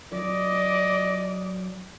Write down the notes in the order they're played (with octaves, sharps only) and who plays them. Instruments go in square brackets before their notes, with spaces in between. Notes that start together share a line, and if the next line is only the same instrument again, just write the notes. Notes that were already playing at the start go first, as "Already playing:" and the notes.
[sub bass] F#3 [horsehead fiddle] D5 [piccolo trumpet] D#5